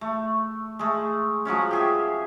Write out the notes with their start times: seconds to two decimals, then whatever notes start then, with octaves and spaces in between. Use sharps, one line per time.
0.01 A3
0.79 G#3 A3
1.45 F3 F#3 G#3 C#4
1.71 G4 G#4 E5